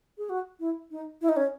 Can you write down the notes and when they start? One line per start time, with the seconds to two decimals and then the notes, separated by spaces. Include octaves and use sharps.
0.18 G#4
0.29 F#4
0.60 E4
0.91 D#4
1.21 E4
1.29 D#4
1.36 C#4